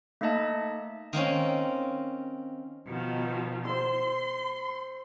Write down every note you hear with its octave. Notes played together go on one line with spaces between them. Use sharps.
A3 A#3 D#4 D#5 E5 A5
D#3 A#3 C4 C#4
B2 D#3 F3
C5 C6 E6